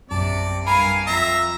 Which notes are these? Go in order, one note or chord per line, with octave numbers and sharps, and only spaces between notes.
A#1 F#2 C3 D5 A5
G2 A#4 F5 G#5 B5
F2 E5 A#5